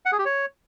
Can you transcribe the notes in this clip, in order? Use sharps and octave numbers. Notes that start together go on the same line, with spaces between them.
F#5
G#4
G4
C#5